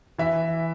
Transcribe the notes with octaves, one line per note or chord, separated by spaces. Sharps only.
E3 E5